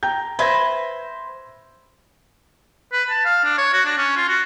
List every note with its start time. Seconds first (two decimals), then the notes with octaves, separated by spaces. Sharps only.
0.03 G5 A#5 G6
0.39 B4 C5 E5 G#6 A#6
2.93 B4
3.10 A5
3.25 F5
3.44 D4
3.58 C#5
3.73 F#4
3.85 D4
3.98 C#4
4.17 F4
4.28 F#4